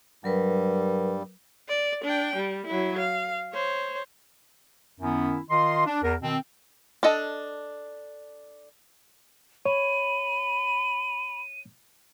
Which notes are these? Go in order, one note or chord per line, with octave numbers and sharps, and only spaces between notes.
G2 F#3 G3 A#4 B4
D5
D4 G5
G3
F#3 E4
F5
C5 C#5
F#2 D#3 B3 C#4 E4
D#3 F4 D#5 C6
D4
E2 A#4
B2 D#3 C4
D4 A4 D#5 A5
C#5 B5 D#7